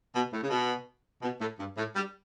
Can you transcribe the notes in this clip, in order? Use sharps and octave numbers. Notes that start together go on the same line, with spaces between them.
B2
A2
C#3
B2
B2
A2
G2
A2
G3